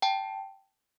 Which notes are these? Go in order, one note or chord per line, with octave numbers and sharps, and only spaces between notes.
G5 A5